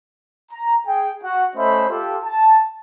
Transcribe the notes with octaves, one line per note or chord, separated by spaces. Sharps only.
A#5
G#4 G5
F#4 F#5
A3 C#4 C5 D#5 E5 B5
F4 G4 A4
A5